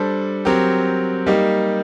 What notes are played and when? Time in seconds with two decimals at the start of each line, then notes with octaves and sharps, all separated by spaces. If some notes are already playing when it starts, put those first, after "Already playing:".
Already playing: G3 D4 A4 C5
0.45 F#3 C4 G4 A#4
1.26 G3 A#3 D#4 G4